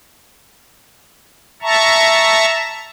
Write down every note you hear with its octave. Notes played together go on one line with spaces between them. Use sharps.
E5 A5 A#5 C#6